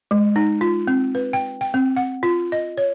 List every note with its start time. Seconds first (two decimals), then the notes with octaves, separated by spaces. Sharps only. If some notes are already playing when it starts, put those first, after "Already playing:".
0.11 G#3
0.36 D#4
0.61 F4
0.87 C4
1.15 B4
1.33 G5
1.61 G5
1.74 C4
1.96 F#5
2.23 F4
2.52 D#5
2.77 C#5